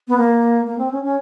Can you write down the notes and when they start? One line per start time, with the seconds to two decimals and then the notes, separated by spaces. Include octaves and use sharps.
0.08 B3
0.17 A#3
0.66 A#3
0.78 C4
0.91 C#4
1.03 C#4